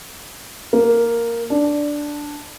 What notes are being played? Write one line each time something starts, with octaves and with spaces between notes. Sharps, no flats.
A#3
D4